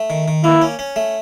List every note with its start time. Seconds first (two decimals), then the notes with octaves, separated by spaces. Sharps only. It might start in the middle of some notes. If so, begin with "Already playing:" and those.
Already playing: A3
0.10 D#3
0.28 D#3
0.44 A#3 E4
0.62 C#4
0.79 C#4
0.96 A3